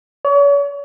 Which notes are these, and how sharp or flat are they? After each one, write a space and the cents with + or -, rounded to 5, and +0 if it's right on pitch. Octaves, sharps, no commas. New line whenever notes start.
C#5 +40